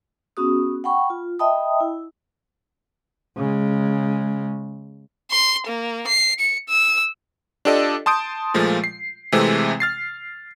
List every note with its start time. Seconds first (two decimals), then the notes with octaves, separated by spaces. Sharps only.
0.37 B3 C#4 F#4 G#4 D#6
0.84 F#5 G5 B5 C#6
1.10 F4
1.39 D#5 E5 G5 A5 B5 D#6
1.80 E4
3.37 C#3 G#3
5.31 C6
5.67 A#3
6.08 C7
6.40 C#7
6.68 E6
7.65 D4 F4 G4 A4 D5 D#5
8.06 A5 C6 D#6 G6 D7
8.54 A#2 F3 G#3 A3 F4
8.84 C7
9.32 C3 E3 G#3 A3 C4
9.80 F6 A6 C7